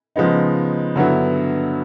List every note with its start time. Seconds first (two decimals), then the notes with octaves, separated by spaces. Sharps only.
0.16 C#3 F3 G#3 B3 D#4
0.95 G2 D3 F#3 B3 E4